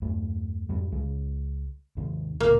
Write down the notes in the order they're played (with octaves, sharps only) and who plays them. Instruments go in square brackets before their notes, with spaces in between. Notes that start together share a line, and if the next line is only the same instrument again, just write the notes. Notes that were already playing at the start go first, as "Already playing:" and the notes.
[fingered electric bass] E2 G2 A3
F2 G#2 G3
C#2 G#3
D#2 G#2 C3
[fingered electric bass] D1 C#2 A#2 [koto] A#3